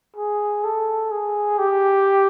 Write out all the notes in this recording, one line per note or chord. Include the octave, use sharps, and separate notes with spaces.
G#4
A4
G#4
G4